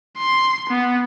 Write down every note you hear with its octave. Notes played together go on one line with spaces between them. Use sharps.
C6
B3